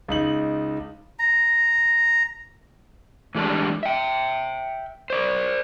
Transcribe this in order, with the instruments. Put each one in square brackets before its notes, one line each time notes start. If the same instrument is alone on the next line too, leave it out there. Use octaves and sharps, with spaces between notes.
[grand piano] C#2 D#4 F#7
[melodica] A#5
[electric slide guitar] A2 E3 G3 G#3 D4 A5
E5 G5
C5 D5